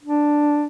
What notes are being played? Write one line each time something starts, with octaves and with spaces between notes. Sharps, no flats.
D4